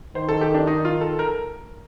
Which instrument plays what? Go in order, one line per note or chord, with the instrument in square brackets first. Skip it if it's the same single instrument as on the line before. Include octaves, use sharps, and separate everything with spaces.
[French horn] D#3 [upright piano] C5
[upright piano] A4
G4
D4
D#4
F4
A4
A#4